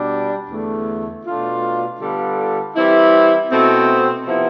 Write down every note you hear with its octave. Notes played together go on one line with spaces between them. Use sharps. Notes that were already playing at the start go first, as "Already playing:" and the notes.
Already playing: B2 G3 D4
E2 D3 A3
B2 A3 D4 F4
D3 G3 B3 F4 A4
E3 G3 C4 E4
B2 A3 C4
C3 F3 B3 E4